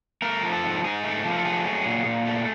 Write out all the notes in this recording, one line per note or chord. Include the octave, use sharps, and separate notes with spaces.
A3 A#4
F3
A4
G#2
G#2 G#4
A3
F3
A4
A3 G#4
F#3
A#2
A#2
A3